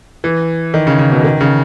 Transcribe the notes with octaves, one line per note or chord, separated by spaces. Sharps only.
E3
D#3
C#3
C#3
B2
D#3
C#3